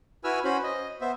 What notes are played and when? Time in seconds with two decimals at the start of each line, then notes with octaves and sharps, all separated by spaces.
0.24 E4 F#4 B4 G#5 E6 F6
0.44 C#4 F#4 C5 B5
0.63 D#5
1.01 B3 C5 E5